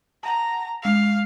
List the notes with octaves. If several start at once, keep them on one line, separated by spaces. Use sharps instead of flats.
F#5 A5 A#5
G#3 F5 F7